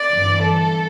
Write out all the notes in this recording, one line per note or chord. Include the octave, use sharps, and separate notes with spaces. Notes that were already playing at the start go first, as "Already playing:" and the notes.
Already playing: D5
G1 G2 E3
A4